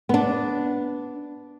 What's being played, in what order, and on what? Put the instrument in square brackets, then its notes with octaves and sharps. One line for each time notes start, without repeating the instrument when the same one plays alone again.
[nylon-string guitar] B3 D4